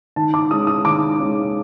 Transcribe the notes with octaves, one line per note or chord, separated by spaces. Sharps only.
D#3 A5
D6
G#3 C#4 D#6
D#6
D#3 D6
G#3 C#4